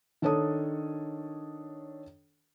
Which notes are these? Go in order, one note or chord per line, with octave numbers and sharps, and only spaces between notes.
D#3 D4 A4 C#5 D#6